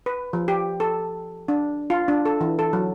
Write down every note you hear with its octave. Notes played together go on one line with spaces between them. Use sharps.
B4
F3
G4
A4
D4
F4
D4
A4
E3
A4
F#3